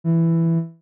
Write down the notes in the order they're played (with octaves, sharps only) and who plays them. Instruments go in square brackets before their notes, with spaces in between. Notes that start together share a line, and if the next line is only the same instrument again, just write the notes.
[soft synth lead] E3